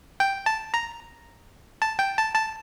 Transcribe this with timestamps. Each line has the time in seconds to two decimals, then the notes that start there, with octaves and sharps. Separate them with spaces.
0.20 G5
0.46 A5
0.74 A#5
1.82 A5
1.99 G5
2.18 A5
2.35 A5